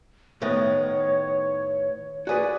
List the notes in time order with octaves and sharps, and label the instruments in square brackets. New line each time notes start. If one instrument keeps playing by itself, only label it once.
[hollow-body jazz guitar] A2 D#3 B3 [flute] C#5
[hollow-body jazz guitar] F#4 G#4 B4 [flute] D5